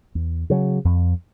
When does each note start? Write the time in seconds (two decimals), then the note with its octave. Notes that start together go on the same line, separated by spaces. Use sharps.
0.15 E2
0.50 C#3 F#3
0.85 F2